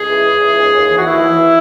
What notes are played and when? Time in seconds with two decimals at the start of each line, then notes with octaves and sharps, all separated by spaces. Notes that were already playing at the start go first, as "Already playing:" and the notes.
Already playing: C#2 G#4
0.08 E3
0.24 E3
0.40 C#2
0.57 D#2
0.73 D#2
0.89 E3
0.97 F#4
1.04 D#2 E4
1.20 E3